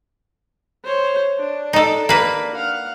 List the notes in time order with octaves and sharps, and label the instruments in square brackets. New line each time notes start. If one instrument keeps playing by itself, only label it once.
[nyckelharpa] C5 C#5
D4
[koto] D#4 A4
A#3 B4
[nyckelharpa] F5 F#5